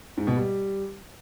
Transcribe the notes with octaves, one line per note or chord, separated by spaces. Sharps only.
G#2
B2
G3